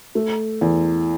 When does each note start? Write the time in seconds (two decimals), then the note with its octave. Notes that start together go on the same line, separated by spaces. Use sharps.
0.15 A3
0.61 E2